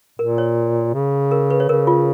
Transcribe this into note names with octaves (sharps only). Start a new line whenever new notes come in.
A#2 A#4
C#5
C#3
A#4
B4
C#5
C#3 A#4
F4